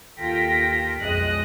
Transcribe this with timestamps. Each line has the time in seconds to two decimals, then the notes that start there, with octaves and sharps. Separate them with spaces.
0.18 D#2 F4 A4 G5 A#6 B6
1.00 B1 F2 G#3 D#5 F#6